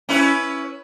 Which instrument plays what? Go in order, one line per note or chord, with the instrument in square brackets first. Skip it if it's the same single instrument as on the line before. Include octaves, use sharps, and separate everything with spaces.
[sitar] C#4 E4 B4